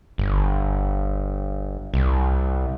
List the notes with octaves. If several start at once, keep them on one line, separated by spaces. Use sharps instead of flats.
G1
C2